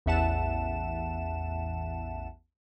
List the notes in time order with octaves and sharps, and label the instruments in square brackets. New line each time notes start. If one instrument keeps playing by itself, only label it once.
[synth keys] A1 E2 E5 F#5 A5 E7